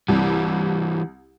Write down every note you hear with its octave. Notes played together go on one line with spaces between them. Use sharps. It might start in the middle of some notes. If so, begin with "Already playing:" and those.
C2 E3 G3